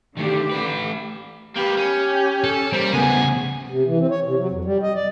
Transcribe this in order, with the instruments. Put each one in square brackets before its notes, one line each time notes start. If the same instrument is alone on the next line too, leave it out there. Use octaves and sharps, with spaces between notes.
[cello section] D3 G4 [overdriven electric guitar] D#3 A3
[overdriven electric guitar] A3 B4
[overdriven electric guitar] A#3 B4 [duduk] G4
[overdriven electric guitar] C#4
[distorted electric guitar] A4
[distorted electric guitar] G3 [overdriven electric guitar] A#3 [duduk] C5
[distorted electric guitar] C#3 A3 [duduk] B3 [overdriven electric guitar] G#5
[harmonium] C3
E3
C4
C#5
C3
F#3
F2
G3
D#5
D5